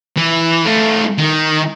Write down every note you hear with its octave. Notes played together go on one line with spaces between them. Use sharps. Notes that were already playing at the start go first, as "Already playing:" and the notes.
E3
A3 F4
D#3